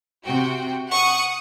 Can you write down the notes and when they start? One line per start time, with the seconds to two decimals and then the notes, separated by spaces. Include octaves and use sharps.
0.24 C3 F#4 G5
0.91 F#5 C#6 D#6